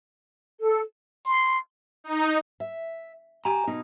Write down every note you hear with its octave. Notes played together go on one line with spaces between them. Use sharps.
A4
C6
D#4
E5
G4 G#5 A#5
B2 D#4